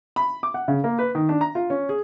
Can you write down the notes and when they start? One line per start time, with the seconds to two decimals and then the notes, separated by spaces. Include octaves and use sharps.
0.16 B5
0.43 D6
0.54 F#5
0.68 C#3
0.84 A#3
0.99 B4
1.15 D#3
1.29 D4
1.41 A#5
1.55 F4
1.70 C#4
1.89 G#4